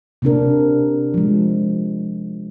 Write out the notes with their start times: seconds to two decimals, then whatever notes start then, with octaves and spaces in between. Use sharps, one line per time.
0.22 C3 C4 D4 A#4
1.14 F3 G#3